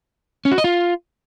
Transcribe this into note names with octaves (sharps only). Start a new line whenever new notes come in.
C#4
F#4
D#5
F4